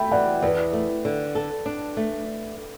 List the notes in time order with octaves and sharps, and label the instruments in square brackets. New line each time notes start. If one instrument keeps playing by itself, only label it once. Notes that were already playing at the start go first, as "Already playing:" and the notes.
Already playing: [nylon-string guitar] A3 [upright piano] E5 G5 B5
[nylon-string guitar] E3 [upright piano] D5 F#5
[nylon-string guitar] E2 [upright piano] B4 D5
[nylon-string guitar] A3
D3
A4
D4
A3